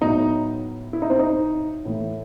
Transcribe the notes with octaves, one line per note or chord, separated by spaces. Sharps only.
A2 F#3 B3 D#4
E4
D#4
C4
D#4
A2 E3 A3